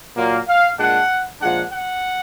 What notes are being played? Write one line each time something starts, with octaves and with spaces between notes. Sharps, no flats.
A#2 F#3 A#3
F5
A#2 G#3 D4 F#5
A#2 F3 G#3 D4 F#5
F#5